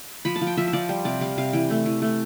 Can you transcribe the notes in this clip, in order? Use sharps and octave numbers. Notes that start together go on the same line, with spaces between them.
F3 B5
A5
F3
G5
F3 E5
E5
F3 D5
G3 C5
C3 D5
G3 F5
C3 F5
E3 G5
A3
E3
A3